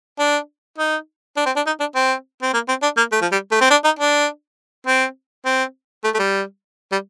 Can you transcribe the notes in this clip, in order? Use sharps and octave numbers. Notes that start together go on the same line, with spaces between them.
D4
D#4
D4
C4
D4
D#4
D4
C4
C4
A#3
C4
D4
A#3
A3
F3
G3
A3
C4
D4
D#4
D4
C4
C4
A3
A3
G3
G3